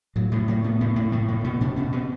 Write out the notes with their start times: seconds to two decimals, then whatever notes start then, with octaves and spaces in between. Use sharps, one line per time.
0.16 A2 F#3
0.31 A2 F#3
0.48 A2 A#3
0.64 A2 B3
0.81 A2 B3
0.96 A2 A#3
1.12 A2 A3
1.28 A2 A#3
1.44 B2 B3
1.61 B2 D4
1.76 B2 C#4
1.92 B2 C4